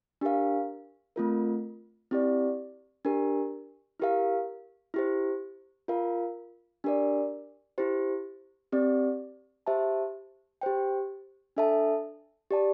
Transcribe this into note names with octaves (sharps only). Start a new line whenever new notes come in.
D4 G4 A#4 F5
A3 C4 F4 A#4
C4 E4 G4 D5
D4 G4 A#4
E4 G4 A#4 F5
E4 G4 C5
F4 A#4 F5
D4 G4 A#4 D5
E4 G4 C5
C4 G4 D5
G4 C5 E5 A5
G4 C5 G5
D4 A4 E5 A5
G4 D5 A5